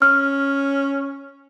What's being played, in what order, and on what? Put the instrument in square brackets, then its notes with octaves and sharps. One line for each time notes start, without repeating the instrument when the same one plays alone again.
[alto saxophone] C#4 [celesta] F6